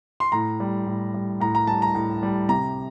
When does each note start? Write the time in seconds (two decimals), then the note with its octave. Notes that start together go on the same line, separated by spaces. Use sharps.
0.20 C6
0.32 A2 A#5
0.60 G3
0.87 A2
1.14 G3
1.40 A2 A#5
1.55 A#5
1.67 G3 A5
1.82 A#5
1.95 A2
2.23 G3
2.49 C3 A#5